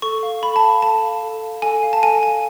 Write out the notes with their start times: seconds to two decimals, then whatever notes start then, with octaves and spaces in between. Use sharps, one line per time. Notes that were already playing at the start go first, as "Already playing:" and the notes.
0.02 A4 C#6
0.23 F5
0.42 A4 B5
0.56 A5
0.63 F5
0.82 A4 A5
1.03 F5
1.23 A4
1.43 F5
1.62 A4 G#5
1.83 F5
1.93 A5
2.03 A4 G#5
2.23 F5 G#5